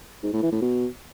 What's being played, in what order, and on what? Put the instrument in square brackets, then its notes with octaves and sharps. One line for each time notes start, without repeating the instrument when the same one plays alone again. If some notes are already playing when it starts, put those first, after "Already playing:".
[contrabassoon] G#2
A2
E3
A2
B2